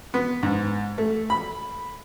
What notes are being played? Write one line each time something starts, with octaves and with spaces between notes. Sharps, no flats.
B3
G#2
A3
B5